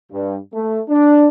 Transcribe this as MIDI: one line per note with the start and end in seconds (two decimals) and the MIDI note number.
0.12 0.37 43
0.53 0.80 57
0.89 1.28 62